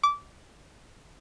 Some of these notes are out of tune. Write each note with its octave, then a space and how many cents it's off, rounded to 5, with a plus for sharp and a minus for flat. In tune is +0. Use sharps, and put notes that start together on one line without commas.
D6 -20